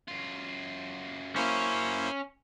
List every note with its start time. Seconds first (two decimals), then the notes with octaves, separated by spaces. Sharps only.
0.08 F#2 F4
1.36 A#3 C#4 E4 C5